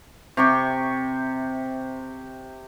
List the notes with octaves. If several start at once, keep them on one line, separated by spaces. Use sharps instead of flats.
C3 G4 C#6